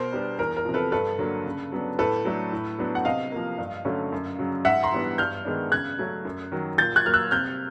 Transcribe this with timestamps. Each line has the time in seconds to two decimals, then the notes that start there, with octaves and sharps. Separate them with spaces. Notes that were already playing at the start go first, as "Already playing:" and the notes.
Already playing: B2 A#4 C5
0.12 G3 B3 D4
0.39 E2 A#4
0.56 A#4
0.65 C3 F3
0.74 A4 B4
0.92 G2 A4 B4
1.19 D3 F#3 A#3 D4
1.46 C#3
1.72 F#3 B3 D4
1.99 A2 A4 B4
2.25 F#3 A3 D4
2.52 A2
2.79 F#3 B3 D4
2.95 F#5
3.05 C3 D#5 F5
3.32 F3 A#3
3.58 G2
3.85 D3 F#3 A3 C#4
4.12 F#2
4.39 C#3 F#3
4.65 G#2 E5 F#5
4.83 A#5 C6
4.92 E3 G3 B3 D4
5.18 G2 F6 G6
5.45 D#3 G#3 B3 D4
5.72 C#3 F#6 G#6
5.98 F#3 A3 C#4
6.25 F#2
6.52 D#3 F#3
6.78 A#2 G6 A6
6.96 F#6 G#6
7.05 F#3 A#3 F6
7.14 E6 F#6
7.31 C3 F6 G6